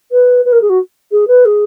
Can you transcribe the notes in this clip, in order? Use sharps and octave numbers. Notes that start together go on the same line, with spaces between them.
B4
B4
A#4
G#4
F#4
G#4
B4
G#4